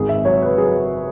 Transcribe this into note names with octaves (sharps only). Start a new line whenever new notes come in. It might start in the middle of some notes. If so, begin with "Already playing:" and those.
Already playing: G#1 G#4
E5
F#3 C#5
B4
F#3 G#4